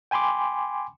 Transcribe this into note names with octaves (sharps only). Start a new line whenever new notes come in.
G5 G#5 B5 C6 D6